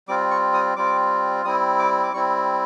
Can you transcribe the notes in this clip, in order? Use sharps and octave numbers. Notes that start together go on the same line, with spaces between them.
G3 C4 F4 D6
C#6
D#6
G3 C4 F4 D6
G3 C4 E4 D#6
D6
D6
G3 C4 E4 C#6